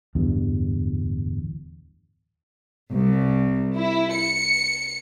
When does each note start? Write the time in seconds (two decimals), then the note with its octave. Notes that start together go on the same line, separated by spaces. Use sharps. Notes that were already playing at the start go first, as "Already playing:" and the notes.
0.15 D1 E2 G2
2.92 C2
3.77 E4
4.14 C#7